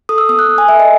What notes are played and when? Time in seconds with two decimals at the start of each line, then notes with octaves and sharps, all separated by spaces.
0.09 A4 D#6
0.18 E6
0.29 B3 D#6
0.39 F#6
0.49 B3
0.58 G#5
0.68 A4 E5
0.79 D#5